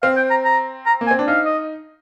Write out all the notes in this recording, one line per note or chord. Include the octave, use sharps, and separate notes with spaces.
C4 F5
G5
A#5
A#5
A#5
A#3
G#5
C4
D4
D#4 F5
D#5